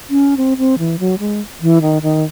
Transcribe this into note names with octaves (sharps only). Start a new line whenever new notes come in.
C#4
C4
C4
E3
F#3
G#3
E3
D#3
D#3